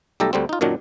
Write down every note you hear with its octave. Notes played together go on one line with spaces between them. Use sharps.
B1 G3 A3 G4 A4 A#5
D2 D3 G3 C4
D#4 F4
F#2 A#2 D#3 F#3 D4